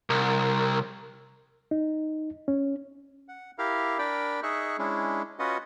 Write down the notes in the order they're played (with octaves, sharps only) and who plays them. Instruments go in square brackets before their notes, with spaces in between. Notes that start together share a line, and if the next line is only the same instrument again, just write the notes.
[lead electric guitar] C2 [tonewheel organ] A#4
[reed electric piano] D#4
C#4
[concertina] F#5
E4 G4 A#4 F5
D4 A#4 D5 G5 B5
D#4 G#4 E5 C#6 F#6
G#3 C#4 D4 E4
C#4 F4 F#4 B4 D#5 F#5